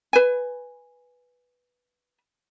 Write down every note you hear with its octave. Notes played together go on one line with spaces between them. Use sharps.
B4 G#5